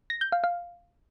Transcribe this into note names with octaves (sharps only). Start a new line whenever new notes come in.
A#6
G6
F5
F5